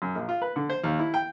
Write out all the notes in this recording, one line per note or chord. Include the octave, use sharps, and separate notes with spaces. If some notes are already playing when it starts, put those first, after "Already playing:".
F#2
A#1
F4
B4
D3
C5
D#2
E4
G5